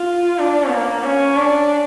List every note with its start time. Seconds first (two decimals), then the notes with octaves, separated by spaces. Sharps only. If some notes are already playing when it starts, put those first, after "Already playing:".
Already playing: F4
0.38 D4
0.71 A#3
1.04 C#4
1.36 D4